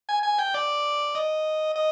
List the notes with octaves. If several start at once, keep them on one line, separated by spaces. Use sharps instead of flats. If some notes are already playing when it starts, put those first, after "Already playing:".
G#5
G#5
G5
D5
D#5
D#5